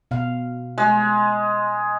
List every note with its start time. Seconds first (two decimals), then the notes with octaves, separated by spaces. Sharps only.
0.11 B2 F5
0.78 G#3